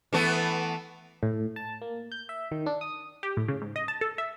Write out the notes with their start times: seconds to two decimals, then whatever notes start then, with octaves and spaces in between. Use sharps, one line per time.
0.13 E3 A3 B3
1.23 A2
1.56 A5
1.82 A#3
2.12 G6
2.29 E5
2.52 D#3
2.66 D4
2.81 D#6
3.23 G4
3.37 A2
3.48 C#3
3.62 G#2
3.76 D#5
3.88 A5
4.01 A4
4.18 E5